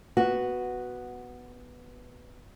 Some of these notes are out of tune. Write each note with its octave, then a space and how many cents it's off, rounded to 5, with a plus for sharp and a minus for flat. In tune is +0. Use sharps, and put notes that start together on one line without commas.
B3 +0 F#4 +0